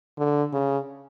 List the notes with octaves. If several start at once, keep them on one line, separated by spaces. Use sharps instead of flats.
D3
C#3